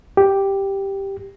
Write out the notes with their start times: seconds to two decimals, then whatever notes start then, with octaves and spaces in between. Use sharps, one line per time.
0.17 G4